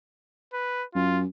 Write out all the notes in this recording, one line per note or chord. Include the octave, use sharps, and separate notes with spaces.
B4
F#2 F4